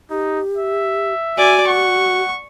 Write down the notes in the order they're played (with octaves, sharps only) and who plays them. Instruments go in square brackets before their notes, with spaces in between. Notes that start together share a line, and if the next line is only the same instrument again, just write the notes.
[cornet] D#4 [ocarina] G4
[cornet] E5
[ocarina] F#4 [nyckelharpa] D5 G#5
[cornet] F#5 [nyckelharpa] C#6